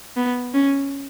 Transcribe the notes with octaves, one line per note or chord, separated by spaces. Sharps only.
B3
C#4